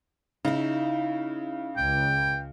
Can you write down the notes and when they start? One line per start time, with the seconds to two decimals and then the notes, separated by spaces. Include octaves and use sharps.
0.45 C#3 D#4 E4
1.77 C#2 G5